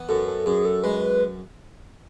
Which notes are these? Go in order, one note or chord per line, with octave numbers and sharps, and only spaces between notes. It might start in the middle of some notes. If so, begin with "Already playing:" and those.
Already playing: E3 B3
F#2 A4
A4
F#2 G#4
A4
G#3 B4